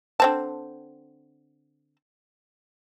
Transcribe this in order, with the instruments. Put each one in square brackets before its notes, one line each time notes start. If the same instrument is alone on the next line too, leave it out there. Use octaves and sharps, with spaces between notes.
[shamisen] D3 C4 A5